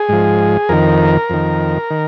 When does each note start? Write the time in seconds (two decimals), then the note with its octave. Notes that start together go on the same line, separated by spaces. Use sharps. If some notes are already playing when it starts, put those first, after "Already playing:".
Already playing: G#4
0.09 G#2 F3
0.69 F2 D#3 A#4
1.30 F2 D#3
1.91 D#3